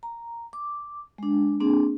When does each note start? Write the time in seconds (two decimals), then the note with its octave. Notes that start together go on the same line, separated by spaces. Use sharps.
0.03 A#5
0.53 D6
1.18 G#3 D4
1.60 A#3 C4 D4 G#4